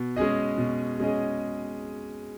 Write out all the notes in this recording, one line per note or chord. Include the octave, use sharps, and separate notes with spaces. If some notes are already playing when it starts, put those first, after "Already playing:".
Already playing: B2
G#3 C#4 G#4 D#5
B2
G#3 C#4 G#4 D#5